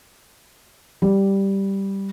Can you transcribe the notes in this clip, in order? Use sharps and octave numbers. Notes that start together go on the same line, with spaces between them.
G3